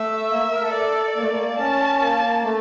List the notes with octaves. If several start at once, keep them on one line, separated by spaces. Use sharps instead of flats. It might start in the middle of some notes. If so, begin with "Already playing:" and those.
Already playing: A3 E5
A#3
A#4
A4
D5
A#3
A3
A#3
C#4 A5
A#3
A3